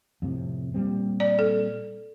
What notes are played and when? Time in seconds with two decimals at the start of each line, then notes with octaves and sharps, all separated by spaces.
0.22 F2 A2 C3
0.74 A#2 G3 C4
1.20 D5
1.39 A4